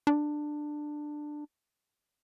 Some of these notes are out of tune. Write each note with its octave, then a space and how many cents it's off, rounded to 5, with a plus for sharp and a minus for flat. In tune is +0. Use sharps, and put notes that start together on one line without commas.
D4 +15